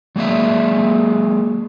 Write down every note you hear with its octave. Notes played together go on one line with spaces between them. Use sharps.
F#3 G#3 A#3 D5 E5